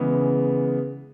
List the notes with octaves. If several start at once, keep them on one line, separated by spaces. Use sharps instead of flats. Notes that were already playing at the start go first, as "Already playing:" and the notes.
Already playing: C#3 E3 G#3 B3